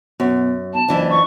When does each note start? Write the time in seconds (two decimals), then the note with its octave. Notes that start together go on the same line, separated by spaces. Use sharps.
0.20 F#2 B2
0.74 B1 A5
0.88 F#1 F2 E3 D4
1.10 C#6